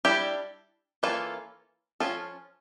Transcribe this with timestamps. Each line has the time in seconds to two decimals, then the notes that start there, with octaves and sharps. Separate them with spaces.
0.05 G3 D4 E4 G4
1.03 E3 A#3 C#4 F4 A4
2.00 F3 C#4 F4 A4